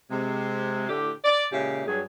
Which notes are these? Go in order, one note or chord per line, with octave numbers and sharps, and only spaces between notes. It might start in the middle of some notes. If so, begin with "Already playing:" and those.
C3 G#3
A2 D3 G4
D5
A#2 C#3 G#3 C#4 E4 G4
G2 F#3 G#4